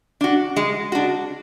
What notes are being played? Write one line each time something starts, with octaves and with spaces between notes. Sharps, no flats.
D4 F#4
G#3
D4 F#4